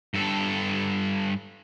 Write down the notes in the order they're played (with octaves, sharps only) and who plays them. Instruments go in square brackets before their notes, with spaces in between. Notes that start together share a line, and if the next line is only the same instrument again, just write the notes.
[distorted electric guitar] G2 A4